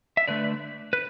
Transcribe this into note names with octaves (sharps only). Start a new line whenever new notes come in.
E5
D3 A3 B4 D5
B4